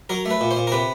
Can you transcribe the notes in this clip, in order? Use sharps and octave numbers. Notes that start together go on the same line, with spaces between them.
F#3 A#4
A3
B4
A#2
C5
A#2
A#4
C3 B4